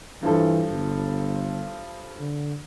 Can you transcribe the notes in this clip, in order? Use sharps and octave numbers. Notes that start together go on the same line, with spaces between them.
G2 E3 F3 A4
G1
D3